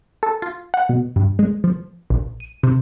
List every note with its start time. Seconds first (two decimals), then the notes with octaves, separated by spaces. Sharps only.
0.23 A4
0.42 F4
0.74 F#5
0.89 B2
1.16 G2
1.39 G#3
1.64 F3
2.10 A#1
2.40 D#7
2.63 C3